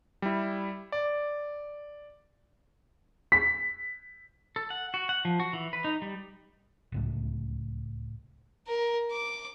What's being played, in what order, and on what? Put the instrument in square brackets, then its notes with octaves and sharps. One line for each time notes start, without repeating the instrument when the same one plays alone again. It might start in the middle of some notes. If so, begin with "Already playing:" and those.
[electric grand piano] G3 E4
D5
[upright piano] B6
[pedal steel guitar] A4
F#5
F#4
F#5
F3
F#4
E3
B4
D#4
G3
[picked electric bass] D1 C#2 A2
[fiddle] A#4
D6